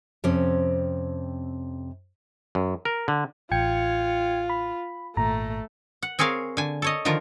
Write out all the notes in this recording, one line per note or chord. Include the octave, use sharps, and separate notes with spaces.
F2 C3 C4 C#4
F#2
A#4
D3
A1 F4 G5 G#6 C#7
B5
G#1 A#2 A3 A#5
F#5
C4 G#4 A#4 C#5 F5
D3 G#5
A4 C#5 D#5
D3 D#3 F3 F4 A#4